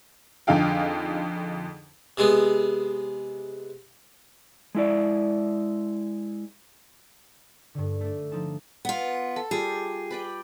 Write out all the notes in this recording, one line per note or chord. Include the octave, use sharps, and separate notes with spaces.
F2 D3 D#4 G#4 F5 G5
C3 G#3 B3
G#3 E4 D5
G2 D3
A3 D4
F3 D4 D#4 A5
B3 F4
A4
G3 F4 G4 G#4
B4 D5 G5